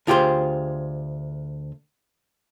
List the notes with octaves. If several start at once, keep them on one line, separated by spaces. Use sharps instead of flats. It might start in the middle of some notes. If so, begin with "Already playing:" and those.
D2 F4 G4 G#4 C5